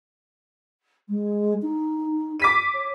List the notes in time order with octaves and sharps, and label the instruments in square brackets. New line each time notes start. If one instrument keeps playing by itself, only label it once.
[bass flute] G#3
D#4
[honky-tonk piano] D6 B6 D#7
[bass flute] C#5